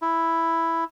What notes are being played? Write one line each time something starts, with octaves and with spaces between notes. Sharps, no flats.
E4